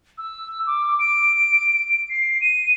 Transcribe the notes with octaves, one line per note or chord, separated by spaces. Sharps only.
E6
D6
D7
C7
D#7